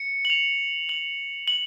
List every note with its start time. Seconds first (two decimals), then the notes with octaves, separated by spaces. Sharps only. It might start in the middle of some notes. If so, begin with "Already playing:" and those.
Already playing: C#7
0.25 F#7
0.30 F7
0.89 F#7
1.48 F#7